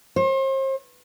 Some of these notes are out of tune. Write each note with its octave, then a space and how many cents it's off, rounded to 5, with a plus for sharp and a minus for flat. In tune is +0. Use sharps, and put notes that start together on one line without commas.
C5 +40